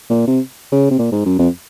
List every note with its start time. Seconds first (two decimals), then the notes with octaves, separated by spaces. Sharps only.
0.10 A#2
0.27 C3
0.72 C#3
0.91 C3
0.99 A#2
1.12 G#2
1.26 F#2
1.39 F2